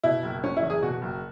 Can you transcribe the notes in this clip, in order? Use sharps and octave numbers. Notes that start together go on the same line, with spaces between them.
B2 E4
F#1
F#1 C#4
E4
E2
G#4
B2 F#4
F#1